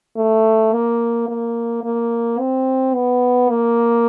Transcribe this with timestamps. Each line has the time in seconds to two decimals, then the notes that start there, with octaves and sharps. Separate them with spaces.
0.16 A3
0.73 A#3
1.28 A#3
1.84 A#3
2.39 C4
2.95 B3
3.50 A#3